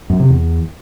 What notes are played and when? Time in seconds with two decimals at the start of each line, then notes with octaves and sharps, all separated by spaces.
0.10 F#2
0.20 C3
0.30 E2